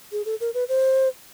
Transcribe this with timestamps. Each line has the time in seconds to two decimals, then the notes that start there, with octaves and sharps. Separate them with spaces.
0.12 G#4
0.25 A4
0.41 A#4
0.54 B4
0.69 C5